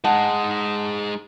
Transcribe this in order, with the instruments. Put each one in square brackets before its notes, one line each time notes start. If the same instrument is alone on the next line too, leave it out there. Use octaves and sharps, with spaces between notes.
[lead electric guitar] G#3 D#4 [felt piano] F#5 A5